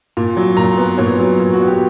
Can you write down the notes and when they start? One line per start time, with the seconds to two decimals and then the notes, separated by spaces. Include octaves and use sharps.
0.17 A#2
0.37 F#3
0.57 A#2 A#5
0.77 B3
0.98 A#2 C#5
1.19 F#3
1.40 A#2
1.53 F#4
1.60 B3
1.67 G4